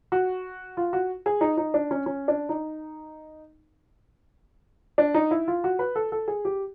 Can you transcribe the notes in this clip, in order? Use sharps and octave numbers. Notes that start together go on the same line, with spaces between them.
F#4
F4
F#4
G#4
D#4
D#4
D4
C#4
C#4
D4
D#4
D4
D#4
E4
F4
F#4
B4
A4
A4
G#4
G4